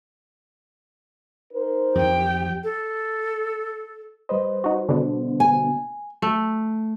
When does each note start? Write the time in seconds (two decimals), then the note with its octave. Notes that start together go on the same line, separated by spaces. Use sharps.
1.53 D#4 A#4 C5
1.95 F2 F3 G4 G5
2.63 A4
4.29 G3 B4 C5 D#5
4.64 D#4 F#4
4.89 B2 D3
5.40 G#5
6.22 A3